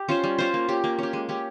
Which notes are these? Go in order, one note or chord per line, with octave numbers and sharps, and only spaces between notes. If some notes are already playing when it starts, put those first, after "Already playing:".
Already playing: G4
C#4 F4 C5
G3
C#4 F4 C5
A#3
C#4 G4
A#3
C#4 G4
G#3
C#4 G4